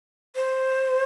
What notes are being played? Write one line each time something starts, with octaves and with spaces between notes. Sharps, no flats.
C5